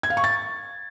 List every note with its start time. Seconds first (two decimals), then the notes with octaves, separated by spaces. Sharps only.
0.03 G#6
0.10 F5
0.17 C#6
0.24 A6